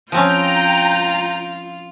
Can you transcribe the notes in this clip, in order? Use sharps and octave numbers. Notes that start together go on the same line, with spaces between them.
F3 C4 C#4 F4 G5 A#5